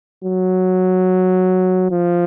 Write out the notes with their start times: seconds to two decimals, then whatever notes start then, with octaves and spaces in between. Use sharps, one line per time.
0.24 F#3
1.91 F3